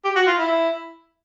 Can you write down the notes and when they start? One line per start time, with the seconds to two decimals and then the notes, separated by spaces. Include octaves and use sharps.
0.04 G4
0.16 F#4
0.27 F4
0.38 E4